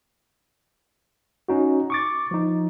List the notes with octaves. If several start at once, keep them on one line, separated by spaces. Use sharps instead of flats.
C#4 D#4 F#4
C#6 D6 A6
F3 D#4